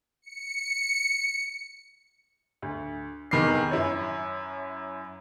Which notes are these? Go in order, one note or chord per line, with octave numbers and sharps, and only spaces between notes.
C#7
D2
F1 E2 D#3 B4 D6 C7
F#2 E4 C#5